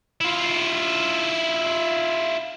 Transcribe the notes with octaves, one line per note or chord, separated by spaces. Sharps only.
E4 F4